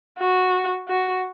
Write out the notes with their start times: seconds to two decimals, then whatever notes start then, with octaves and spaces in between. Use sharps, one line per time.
0.19 F#4
0.88 F#4